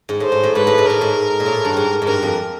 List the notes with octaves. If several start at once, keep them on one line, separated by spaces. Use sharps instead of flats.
G#2
A2 C5
G#2
A2
G#2 B4
A2
G#2
A2 A#4
G#2
A#2
A2
G2
G#2
G#2
G2 A#4
F2